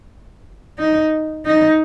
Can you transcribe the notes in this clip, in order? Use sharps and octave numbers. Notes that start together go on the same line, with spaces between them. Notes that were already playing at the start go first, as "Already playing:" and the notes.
D#4
D#4